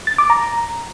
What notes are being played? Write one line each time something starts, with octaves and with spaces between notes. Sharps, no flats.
A6
D6
A#5